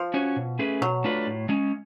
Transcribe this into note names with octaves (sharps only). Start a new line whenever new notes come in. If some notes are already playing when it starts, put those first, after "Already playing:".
Already playing: F3
C#4 F#4 C#5
B2
A3 C#4 G#4 B4
B2 F#3
A3 D4 F4 B4
A2
G#3 C#4